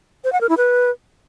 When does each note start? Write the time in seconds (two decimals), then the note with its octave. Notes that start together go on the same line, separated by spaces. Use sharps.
0.24 C5
0.32 F#5
0.41 A#4
0.49 E4
0.57 B4